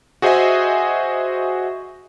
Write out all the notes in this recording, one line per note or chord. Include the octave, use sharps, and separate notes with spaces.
F#4 G#4 C5 D#5 E5 G#5